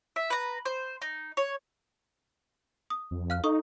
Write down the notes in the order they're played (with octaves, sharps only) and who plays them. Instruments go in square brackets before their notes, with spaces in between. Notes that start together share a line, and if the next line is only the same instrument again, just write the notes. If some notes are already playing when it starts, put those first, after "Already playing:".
[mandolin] E5
B4 A#5
C5
D#4
C#5
[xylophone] D#6
[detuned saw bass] F2
[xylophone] F5 F6 F#6
[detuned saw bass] D#4 [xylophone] A4 C#6 D#6